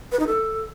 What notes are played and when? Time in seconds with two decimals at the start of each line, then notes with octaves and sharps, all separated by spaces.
0.12 B4
0.19 D#4
0.27 A4